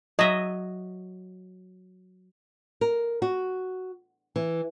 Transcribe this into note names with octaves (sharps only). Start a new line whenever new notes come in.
F#3 D#5 E5
A#4
F#4
E3